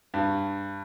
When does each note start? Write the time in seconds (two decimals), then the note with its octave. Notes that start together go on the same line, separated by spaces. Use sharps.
0.14 G2